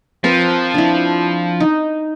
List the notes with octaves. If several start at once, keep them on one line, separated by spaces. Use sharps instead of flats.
F3 C4 A#4 B4
D4 E4
D#4